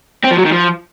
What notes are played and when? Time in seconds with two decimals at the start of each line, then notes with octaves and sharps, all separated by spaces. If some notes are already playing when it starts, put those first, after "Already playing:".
0.24 C4
0.31 F3
0.38 F#3
0.45 D#3
0.52 F3